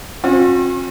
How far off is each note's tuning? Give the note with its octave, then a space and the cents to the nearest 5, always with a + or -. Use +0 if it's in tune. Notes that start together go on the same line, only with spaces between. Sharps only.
C#4 -45 F4 +45